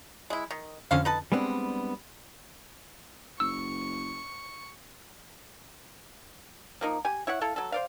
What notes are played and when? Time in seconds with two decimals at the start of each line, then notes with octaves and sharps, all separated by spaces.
0.30 G#3 E4
0.51 D#3
0.91 F2 D3 C#4 C5 F5
1.05 D#4 B4 A5
1.32 G3 G#3 B3 C4 D4
3.40 F#1 C#6 E6
6.81 F3 A#3 D#4
7.05 G4 G#5
7.27 E4 C#5 E5 F#5
7.41 E4 A4 F5
7.56 F#3 A4
7.72 C5 D5 F5